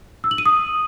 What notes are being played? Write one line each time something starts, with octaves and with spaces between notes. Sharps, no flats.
E6
F#7
D#7
D#6